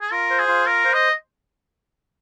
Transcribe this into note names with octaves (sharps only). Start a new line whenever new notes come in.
G#4
F4 A#4
C5
G#4
F4
A#4 F5
C5
D#5